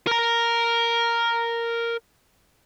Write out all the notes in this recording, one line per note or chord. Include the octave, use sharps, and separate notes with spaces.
A#4 A#5